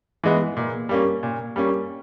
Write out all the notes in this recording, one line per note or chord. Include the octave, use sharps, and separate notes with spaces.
E3 G#3 B3
A#2
G3 A#3 C#4
A#2
G3 A#3 C#4